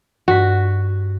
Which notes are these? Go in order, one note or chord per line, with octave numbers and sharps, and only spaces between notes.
G2 F#4 A#6 B6